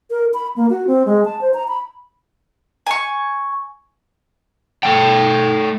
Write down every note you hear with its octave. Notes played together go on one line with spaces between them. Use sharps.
A#4
B5
A#3
F#4
C4
G#3
A5
C5
A#5
B5
G#5 C#6
A3 G5